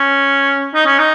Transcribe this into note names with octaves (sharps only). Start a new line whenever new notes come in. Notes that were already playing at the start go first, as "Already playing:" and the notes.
Already playing: C#4
D#4
C#4
D#4